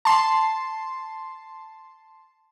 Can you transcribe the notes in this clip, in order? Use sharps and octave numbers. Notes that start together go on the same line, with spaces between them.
A5 C6